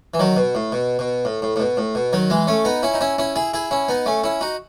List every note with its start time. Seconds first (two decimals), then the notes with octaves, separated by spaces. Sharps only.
0.14 E3
0.19 D#3 F#3
0.37 B2
0.55 A2
0.72 B2
0.99 B2
1.25 A2
1.42 A2
1.56 A2
1.60 B2
1.77 A2
1.95 B2
2.13 D#3 F#3
2.30 E3 G#3
2.47 A3 C#4
2.65 B3 D#4
2.83 C#4 E4
2.94 D#4
3.01 C#4 E4
3.18 C#4 E4
3.36 E4 G#4
3.54 E4 G#4
3.71 C#4 E4
3.88 B3 D#4
4.06 A3 C#4
4.24 C#4 E4
4.41 D#4 F#4